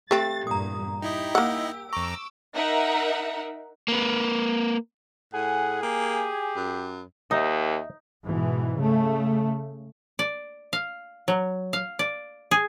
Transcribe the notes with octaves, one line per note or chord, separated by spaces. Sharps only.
A3 C4 G4 A6
E2 G2 A#2 A#5 D#6
D#4 E4 G4 D#5
A#3 F#5 E6
F2 A#5 C#6 D6 E6
D#4 A#4 E5 F#5
A#3 B4
A2 G#4 F#5 G#5
A#3 G4
F#2
D#2 D#4 D#5 E5
G#2 B2 E3
C#3 A3
D5
F5
F#3
F5
D5
G#4